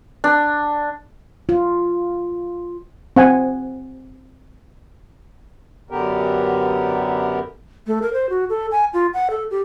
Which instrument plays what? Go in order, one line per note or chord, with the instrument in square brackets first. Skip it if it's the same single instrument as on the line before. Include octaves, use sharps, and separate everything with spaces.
[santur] D4
[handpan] F4
[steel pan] C4 F#5 G#5
[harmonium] F#2 D3 B3 G4 A#4
[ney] A3
A#4
C5
F#4
A4
G#5
F4
F#5
A4
G4